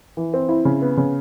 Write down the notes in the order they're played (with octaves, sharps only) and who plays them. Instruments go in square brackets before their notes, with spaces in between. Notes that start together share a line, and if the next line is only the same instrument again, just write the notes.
[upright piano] E3
C4
E4
C#3
B3
C#3